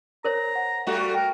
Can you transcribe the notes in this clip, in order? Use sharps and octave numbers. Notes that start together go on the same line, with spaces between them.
A#4 C5 C#5 A#5
F#5
G3 A3 F#4
A#4 G5